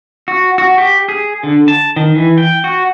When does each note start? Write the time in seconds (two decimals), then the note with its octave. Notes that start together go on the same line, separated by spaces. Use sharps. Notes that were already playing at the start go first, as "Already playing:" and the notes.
0.28 F#4
0.58 F#4
0.78 G4
1.09 G#4
1.43 D3
1.68 A5
1.96 D#3
2.15 E3
2.38 G5
2.64 F#4